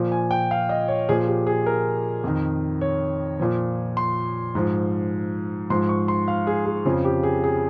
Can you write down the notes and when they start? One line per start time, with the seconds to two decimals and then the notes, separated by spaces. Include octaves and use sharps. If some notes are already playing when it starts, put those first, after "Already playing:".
Already playing: A#2 F3
0.12 G#5
0.31 G5
0.51 F5
0.69 D#5
0.88 C#5
1.09 A#2 F3 G#4
1.28 G4
1.47 G#4
1.66 A#4
2.24 F2 D#3
2.81 C#5
3.40 A#2 F3
3.97 C6
4.55 G#2 F3
5.70 G#2 F3 C6
5.89 C#6
6.08 C6
6.28 F5
6.47 G#4
6.65 G#4
6.85 F2 C#3 F3 G#4
7.05 G4
7.23 G#4
7.44 G#4